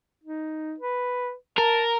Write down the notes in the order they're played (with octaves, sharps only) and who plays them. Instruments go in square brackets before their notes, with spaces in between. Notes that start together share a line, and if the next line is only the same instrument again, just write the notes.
[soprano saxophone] D#4
B4
[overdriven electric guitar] A#4 [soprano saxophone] A5